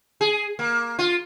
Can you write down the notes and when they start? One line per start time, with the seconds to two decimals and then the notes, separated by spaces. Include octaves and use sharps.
0.21 G#4
0.59 A#3
0.99 F4